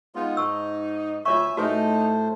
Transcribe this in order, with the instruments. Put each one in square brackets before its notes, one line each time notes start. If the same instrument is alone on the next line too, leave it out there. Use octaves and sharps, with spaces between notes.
[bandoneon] G#3 B3 F4 [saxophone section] D#4
[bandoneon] G#2 [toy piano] A5 C#6 E6
[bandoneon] D2 G#5 [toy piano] F4 C#5 C#6 [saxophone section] E5
[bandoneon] A2 C5 [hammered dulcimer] A3 [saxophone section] D#4 [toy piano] F#4 B4 G#5